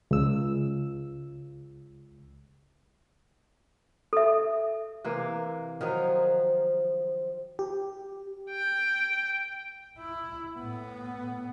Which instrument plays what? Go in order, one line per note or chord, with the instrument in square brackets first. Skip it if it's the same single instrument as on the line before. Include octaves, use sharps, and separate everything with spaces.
[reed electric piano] C#2 E6
[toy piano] A4 E5
[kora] C3 E3 A#3
[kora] D#3 F#3 D#4 [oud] F3
[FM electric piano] G4
[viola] G5
[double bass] E4
A2 B3